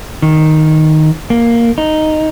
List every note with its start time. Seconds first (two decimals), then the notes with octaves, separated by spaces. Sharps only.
0.22 D#3
1.30 A#3
1.78 D#4